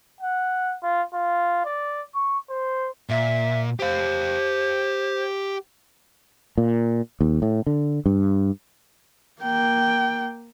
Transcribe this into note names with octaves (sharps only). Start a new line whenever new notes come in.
F#5
F4
F4
D5
C#6
C5
A#2 E5
G4 C5 F5
A#2
D#2
A2
D3
G2
A#3 G5